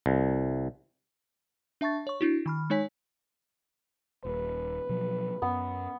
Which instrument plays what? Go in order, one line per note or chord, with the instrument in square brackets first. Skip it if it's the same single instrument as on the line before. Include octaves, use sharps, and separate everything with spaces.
[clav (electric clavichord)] C2
[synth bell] D4 E5 A5 C#6 A6
C#5 C#6
D4 E4 F#4
D#3 B5 F6
G#3 D#4 C#5 G#5 B6
[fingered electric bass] D#1 [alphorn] B4
[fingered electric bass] B2 F3 F#3
[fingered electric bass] F#2 [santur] B3